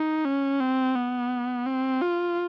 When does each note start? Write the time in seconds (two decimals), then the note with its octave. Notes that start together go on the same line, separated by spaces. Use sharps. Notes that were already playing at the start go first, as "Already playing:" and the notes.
Already playing: D#4
0.25 C#4
0.60 C4
0.95 B3
1.66 C4
2.02 F4